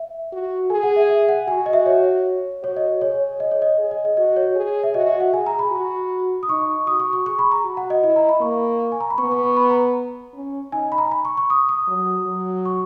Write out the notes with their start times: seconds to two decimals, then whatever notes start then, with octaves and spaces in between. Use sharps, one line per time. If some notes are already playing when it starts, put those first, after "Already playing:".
Already playing: E5
0.33 F#4
0.70 G#4 G#5
0.83 F#5
0.96 E5
1.09 E5
1.29 F#5
1.48 F#4 G#5
1.66 D#5
1.73 E5
1.86 C#5
2.63 F#4 C#5
2.77 D#5
3.01 G#4 C#5
3.40 D#5
3.51 C#5
3.62 D#5
3.78 G#4
3.91 D#5
4.05 D#5
4.17 F#4 D#5
4.37 C#5
4.56 G#4
4.83 E5
4.94 F#4 D#5
5.07 E5
5.20 F#5
5.33 G#4 G#5
5.47 A#5
5.59 B5
5.72 F#4
6.43 D#6
6.49 D#4 C#6
6.87 F#4 D#6
7.00 C#6
7.13 C#6
7.26 G#4 C#6
7.39 B5
7.52 A#5
7.64 F#4
7.77 F#5
7.90 D#5
8.03 E4 D#5
8.16 A#5
8.29 B5
8.41 A#3 C#6
8.92 G#5
9.01 A#5
9.10 B5
9.18 B3 C#6
9.31 C#6
9.44 C#6
9.57 B5
9.70 A#5
10.34 C#4
10.72 D#4 G#5
10.92 B5
10.98 A#5
11.12 B5
11.25 C#6
11.37 C#6
11.50 D#6
11.69 D#6
11.88 F#3
12.27 F#3
12.66 C#6